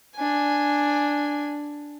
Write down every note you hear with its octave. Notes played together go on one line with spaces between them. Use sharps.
D4 G#5